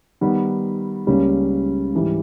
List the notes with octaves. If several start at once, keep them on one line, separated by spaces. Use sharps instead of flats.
D#3 G3 B3
C#2 C#3 G3 A#3 C#4
G#2 E3 G3